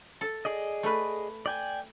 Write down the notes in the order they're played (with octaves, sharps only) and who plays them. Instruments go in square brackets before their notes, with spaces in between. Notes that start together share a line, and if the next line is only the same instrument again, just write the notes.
[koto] A4
[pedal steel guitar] G#4 D5 D#5
[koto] A3 B4
[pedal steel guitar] D5 G5 G#5